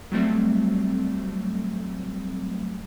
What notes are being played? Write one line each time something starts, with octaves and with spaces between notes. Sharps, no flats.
F#3 G3 A3 C4